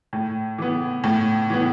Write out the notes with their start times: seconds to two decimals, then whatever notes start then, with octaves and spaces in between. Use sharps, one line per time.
0.13 A2
0.58 E3 B3
1.04 A2
1.50 E3 B3